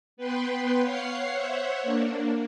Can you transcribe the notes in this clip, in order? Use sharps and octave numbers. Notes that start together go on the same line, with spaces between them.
B3 B4 G5 C6
C#5 F5 F#5 C7
C5 C#5 E5 F#5
A#3 D4